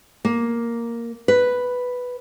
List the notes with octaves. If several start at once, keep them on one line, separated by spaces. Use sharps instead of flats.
A#3
B4